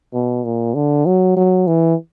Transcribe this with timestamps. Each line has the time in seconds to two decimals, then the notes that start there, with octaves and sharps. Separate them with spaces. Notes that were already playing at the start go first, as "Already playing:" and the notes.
0.13 B2
0.44 A#2
0.74 D3
1.06 F#3
1.36 F#3
1.67 E3